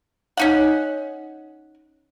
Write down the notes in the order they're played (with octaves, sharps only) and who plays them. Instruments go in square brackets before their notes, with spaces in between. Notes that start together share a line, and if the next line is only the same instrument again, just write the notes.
[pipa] C#4 D#4 F#5